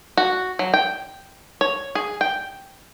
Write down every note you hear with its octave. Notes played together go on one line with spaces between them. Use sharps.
F#4
F#3
G5
C#5
G#4
G5